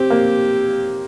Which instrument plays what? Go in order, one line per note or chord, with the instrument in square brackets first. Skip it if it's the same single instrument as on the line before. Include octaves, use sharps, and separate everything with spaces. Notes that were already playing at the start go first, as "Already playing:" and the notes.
Already playing: [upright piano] C4 [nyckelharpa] G4
[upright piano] A#3